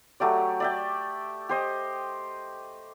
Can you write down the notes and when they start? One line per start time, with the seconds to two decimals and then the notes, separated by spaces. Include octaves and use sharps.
0.20 F#3 A3 G4 D5
0.60 D5 E5 G5
1.49 G4 C5 D#5